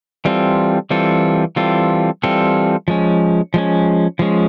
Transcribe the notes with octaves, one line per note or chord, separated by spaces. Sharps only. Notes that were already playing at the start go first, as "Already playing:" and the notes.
E3 G3 C4 F4 A4
E3 G3 C4 F4 A4
E3 G3 C4 F4 A4
E3 G3 C4 F4 A4
F3 G#3 C#4
F3 G#3 C#4
F3 G#3 C#4